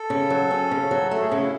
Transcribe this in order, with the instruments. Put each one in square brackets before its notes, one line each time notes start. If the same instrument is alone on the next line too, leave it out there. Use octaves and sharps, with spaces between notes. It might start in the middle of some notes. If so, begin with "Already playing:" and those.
Already playing: [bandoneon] A4
[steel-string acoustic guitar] C#3
F#3
C#4
C#3
F#3
[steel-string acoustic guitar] A3 [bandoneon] A4
[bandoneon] G#4
[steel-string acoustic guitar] C#3 [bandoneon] F#4
[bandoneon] E4